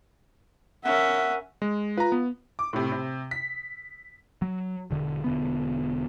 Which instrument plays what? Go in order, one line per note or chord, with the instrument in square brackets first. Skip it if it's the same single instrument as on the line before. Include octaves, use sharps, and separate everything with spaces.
[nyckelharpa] C#4 A#4 [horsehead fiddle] E5 [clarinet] F#5
[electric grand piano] G#3
[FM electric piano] F4 [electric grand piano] B4 A#5
[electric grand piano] B3
[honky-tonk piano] D6
A2 C3
C3
B6
[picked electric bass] F#3
E1 D3
E1 D3 B3